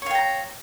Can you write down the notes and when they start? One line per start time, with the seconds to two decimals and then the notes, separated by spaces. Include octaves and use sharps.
0.02 C#5
0.06 F5
0.11 G5
0.15 A#5